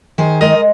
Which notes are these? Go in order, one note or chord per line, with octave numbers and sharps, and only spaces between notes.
D#3 G#4 C5
G#3 A#4 D#5